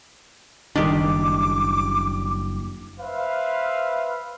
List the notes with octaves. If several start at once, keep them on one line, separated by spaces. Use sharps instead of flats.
F#1 D#3 G3 D4 G4 D6
B4 C5 E5 F5